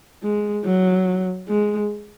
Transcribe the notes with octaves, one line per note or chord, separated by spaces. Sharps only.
G#3
F#3
G#3